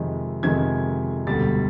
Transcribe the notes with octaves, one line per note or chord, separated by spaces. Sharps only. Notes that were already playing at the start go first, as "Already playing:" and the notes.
Already playing: F2 C3 D#3 G#3
F2 C3 D#3 G#3 G#6
E1 D2 D3 G3 A6